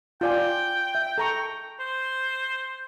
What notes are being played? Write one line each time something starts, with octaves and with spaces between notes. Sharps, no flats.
F4 D5 G5 G#5
E5
A4 A#5 C#6
C5